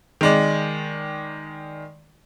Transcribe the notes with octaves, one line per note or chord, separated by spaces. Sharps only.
D#3 G#3 D5